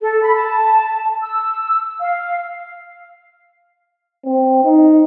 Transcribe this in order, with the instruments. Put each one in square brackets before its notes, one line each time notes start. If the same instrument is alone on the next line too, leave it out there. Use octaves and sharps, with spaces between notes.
[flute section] A4
B5
A5
E6
F5
[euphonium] C4
D#4